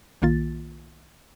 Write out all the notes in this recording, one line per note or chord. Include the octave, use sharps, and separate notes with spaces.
B1 D#3 A#3 F4 A6